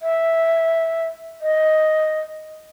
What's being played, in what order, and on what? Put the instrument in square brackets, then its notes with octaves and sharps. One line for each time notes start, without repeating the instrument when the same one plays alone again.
[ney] E5
D#5